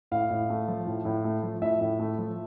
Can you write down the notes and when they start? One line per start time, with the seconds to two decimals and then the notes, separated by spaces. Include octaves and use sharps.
0.11 A2 F5
0.30 A2
0.50 A3
0.68 F3
0.87 A2
1.05 A2
1.24 A3
1.43 F3
1.62 A2 E5
1.81 A2
1.99 A3
2.19 F3